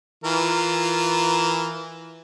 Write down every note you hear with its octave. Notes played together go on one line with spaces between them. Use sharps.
E3 F4 A#4